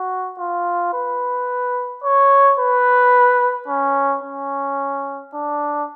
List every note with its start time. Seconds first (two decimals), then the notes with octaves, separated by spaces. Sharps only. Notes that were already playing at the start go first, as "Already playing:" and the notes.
Already playing: F#4
0.39 F4
0.94 B4
2.04 C#5
2.59 B4
3.68 C#4
4.23 C#4
5.35 D4